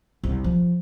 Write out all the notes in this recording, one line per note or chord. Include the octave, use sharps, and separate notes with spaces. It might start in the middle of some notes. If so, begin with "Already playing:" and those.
C2 C3
F3